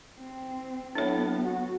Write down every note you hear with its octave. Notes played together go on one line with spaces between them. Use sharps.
C4
A2 F#3 B3 D4 C#5
F#4